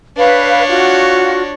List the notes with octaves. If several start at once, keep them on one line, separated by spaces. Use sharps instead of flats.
D4 B4 C#5 F5
F4 F#4